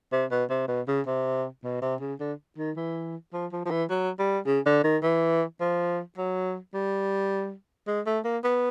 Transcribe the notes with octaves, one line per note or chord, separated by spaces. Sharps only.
C3
B2
C3
B2
C#3
C3
B2
C3
C#3
D3
D#3
E3
F3
F3
F3
E3
F#3
G3
C#3
D3
D#3
E3
F3
F#3
G3
G#3
A3
A#3
B3